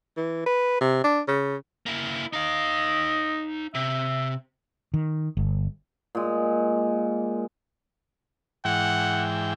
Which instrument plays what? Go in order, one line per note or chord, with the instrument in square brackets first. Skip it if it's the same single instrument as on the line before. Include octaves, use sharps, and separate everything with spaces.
[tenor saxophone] E3
B4
C3
D4
C#3
[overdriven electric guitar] A#3 E4
[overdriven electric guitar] D#4 F5 [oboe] D#5
[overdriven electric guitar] C3 [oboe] E5
[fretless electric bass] D#3
G1
[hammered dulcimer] A#2 G#3
[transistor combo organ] G#2 E3 G5 [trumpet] F#5